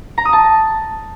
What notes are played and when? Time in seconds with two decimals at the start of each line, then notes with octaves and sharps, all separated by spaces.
0.18 A#5
0.25 D#6
0.33 A5